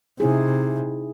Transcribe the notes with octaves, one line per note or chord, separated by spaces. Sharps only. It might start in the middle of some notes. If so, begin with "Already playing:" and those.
C3 D#4 E4 G#4